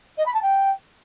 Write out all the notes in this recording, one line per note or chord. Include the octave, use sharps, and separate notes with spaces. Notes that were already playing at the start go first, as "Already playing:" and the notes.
D#5
B5
A5
G5